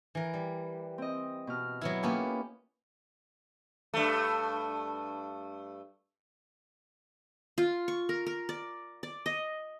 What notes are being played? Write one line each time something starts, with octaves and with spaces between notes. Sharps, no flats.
E3 A#4
G3
C4 D#5
B2 F6
F#3 B3 E4
A#3 B3 C#4 F4 G4 A4
G2 A3
F4
C#6
A#4
A#4
D5
D5
D#5